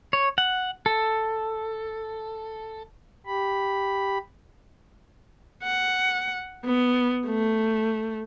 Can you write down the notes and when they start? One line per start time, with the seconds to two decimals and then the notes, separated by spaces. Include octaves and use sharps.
0.13 C#5
0.38 F#5
0.86 A4
3.26 G4 B5
5.63 F#5
6.65 B3
7.26 A3